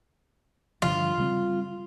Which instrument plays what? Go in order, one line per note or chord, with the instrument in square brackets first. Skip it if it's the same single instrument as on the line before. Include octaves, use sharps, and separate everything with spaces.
[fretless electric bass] G2 D3 F3 [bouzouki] F4
[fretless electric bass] C#3 G3 C4